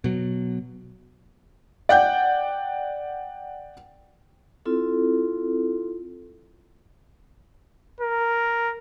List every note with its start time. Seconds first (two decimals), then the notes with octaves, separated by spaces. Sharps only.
0.04 B2 F#3
1.89 D5 F#5 G5 G6
4.65 C4 E4 F4 A4
8.01 A#4